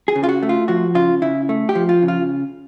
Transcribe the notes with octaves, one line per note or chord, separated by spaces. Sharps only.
G#4
C#3
F4
F#4
A3
F4
F3 F#4
C#3 F4
C#3 E4
A3
G4
F3
F4
C#3
F4